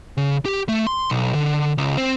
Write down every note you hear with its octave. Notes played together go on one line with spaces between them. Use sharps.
C#3
G4
A3
C6
B1
D3
C#2
C4